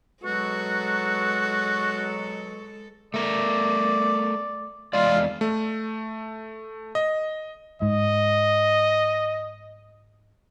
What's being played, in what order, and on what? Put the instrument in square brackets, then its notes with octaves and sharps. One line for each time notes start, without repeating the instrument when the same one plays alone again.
[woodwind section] B2 F#3 C#6 [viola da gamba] G#3 A4 [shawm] F#4
[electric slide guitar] A3 A#4 [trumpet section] D5
[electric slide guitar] E2 G#3 D5 [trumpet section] F4
[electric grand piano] A3
D#5
[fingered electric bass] G#2 [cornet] D#5